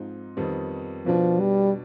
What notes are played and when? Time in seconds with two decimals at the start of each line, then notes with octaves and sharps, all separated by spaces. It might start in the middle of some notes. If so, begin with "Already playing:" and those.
Already playing: G#2 F3 C4 D#4
0.37 F2 D#3 G3 B3
1.06 B2 F3 B3 D4
1.40 G3